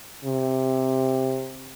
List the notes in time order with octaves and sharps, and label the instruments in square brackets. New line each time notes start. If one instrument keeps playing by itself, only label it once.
[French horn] C3